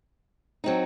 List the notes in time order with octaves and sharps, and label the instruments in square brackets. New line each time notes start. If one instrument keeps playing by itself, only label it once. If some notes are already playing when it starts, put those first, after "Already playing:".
[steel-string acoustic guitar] F#3 C4 D#4